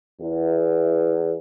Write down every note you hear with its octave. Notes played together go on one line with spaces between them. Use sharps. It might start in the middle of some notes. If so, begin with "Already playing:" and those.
E2